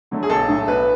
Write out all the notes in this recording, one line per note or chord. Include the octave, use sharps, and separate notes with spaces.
D3 F#3 A3
G#4
B1 A4
A2 F#3 A3
B1 B4